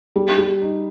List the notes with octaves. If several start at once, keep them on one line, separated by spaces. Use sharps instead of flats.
G3
G3
D#4